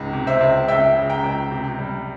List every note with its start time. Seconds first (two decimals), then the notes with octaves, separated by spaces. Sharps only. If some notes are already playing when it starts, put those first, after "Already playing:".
Already playing: C#2 G#2
0.13 C3
0.27 C5 E5
0.41 C#2
0.68 C#2 E5 G5
0.96 C#3
1.10 G5 A#5
1.24 C#2
1.51 C3
1.79 G3